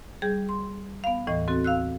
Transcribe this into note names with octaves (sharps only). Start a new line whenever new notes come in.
G3 G#4 G6
C6
B3 F5
D#2 A2 E3 D#5
C4 F#4 A4
F5 E6 F#6